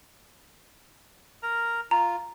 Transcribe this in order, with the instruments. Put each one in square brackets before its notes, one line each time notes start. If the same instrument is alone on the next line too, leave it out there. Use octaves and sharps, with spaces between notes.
[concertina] A#4 A#5
[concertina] F4 [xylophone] A#5